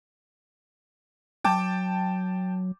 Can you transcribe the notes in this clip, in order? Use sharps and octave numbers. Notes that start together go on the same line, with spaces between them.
F#3 G5 A5 D6